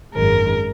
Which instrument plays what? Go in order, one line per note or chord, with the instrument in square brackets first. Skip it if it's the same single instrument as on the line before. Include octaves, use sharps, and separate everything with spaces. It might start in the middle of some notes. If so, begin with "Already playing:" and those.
[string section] G#1 F#2 D#3 G#3 [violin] A#4